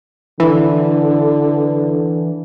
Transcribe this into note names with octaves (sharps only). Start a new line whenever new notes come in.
D3 E3